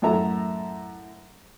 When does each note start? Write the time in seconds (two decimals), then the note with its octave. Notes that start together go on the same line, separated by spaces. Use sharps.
0.02 F#2 A2 A4 E5 A#5